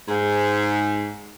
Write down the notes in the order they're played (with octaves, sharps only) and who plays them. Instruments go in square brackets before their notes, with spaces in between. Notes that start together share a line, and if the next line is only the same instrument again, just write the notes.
[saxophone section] G#2